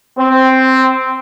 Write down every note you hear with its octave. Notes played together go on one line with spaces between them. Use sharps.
C4